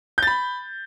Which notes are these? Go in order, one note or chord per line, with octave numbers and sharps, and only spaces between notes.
B5 G6 A6